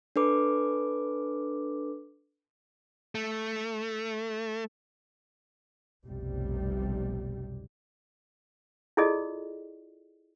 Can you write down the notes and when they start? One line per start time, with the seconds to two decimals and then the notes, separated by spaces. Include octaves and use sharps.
0.16 D4 A4 B4 D6
3.15 A3
6.05 F1 B1 C3 G3
8.97 E4 F4 G#4 A4 D5 D#5